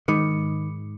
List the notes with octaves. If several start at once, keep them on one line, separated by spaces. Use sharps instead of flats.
G#2 D#3 B5 D6 C#7